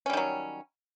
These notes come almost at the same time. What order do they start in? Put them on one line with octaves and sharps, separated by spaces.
C#4 G3 D#3 F#3